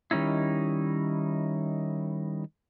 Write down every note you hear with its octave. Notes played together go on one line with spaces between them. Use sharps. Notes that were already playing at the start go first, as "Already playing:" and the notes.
D#3 G3 C#4 D#4 E4